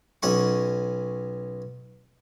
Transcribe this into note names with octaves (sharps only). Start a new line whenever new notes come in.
B1 C#4 F#5 C#6